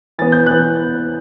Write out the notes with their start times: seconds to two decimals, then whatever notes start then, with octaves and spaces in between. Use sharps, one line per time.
0.18 E3 A6
0.22 B3
0.32 G6
0.46 E3 B3 F#6